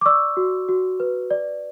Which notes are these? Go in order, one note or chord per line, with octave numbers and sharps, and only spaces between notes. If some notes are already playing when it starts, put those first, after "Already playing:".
D6
D5 C#6 E6
F#4
F#4
B4
D5